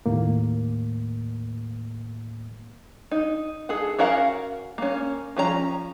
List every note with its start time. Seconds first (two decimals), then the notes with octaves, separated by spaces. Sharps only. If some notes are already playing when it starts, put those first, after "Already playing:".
0.06 D#2 A2 A#3
3.11 D#4
3.69 G#4 A4 F#5
3.98 C#4 F#4 A#4 F5 F#5
4.78 A#3 C#4
5.36 F3 C#4 G#4 A#5